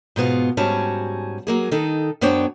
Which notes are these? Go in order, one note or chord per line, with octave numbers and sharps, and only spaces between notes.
G#2 B2 B3 F4
G#2 G3 C#4 F#4 A5
F#3 A#3 G#4
D#3 D#4 A4
F#2 B3 D4 C5 C#5 G5